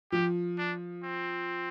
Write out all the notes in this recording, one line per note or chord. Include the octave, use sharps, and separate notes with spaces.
F3 G4
D4
C4